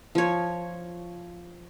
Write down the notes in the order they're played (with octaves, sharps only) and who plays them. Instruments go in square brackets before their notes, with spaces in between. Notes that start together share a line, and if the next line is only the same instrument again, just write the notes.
[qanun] F3 C#5